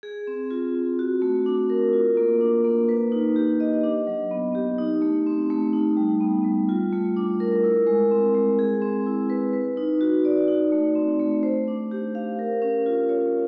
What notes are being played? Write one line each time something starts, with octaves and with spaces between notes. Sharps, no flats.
G#4
C4
F4
C4
F#4
A3
D4
A#4
F4
A#3
D4
A#3
B4
D#4
G4
D#5
D4
F#3
B3
G4
D#4
A3
C4
A3
D#4
G3
B3
G3
F4
A3
D4
A#4
E4
G#3
C4
G#3
G#4
C4
E4
B4
B4
D#4
F#4
D5
D#4
A3
C4
A3
C5
D4
G4
F5
A#4
C#4
F4
C#5